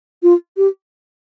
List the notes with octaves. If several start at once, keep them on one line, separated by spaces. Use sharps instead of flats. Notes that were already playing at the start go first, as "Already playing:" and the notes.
F4
G4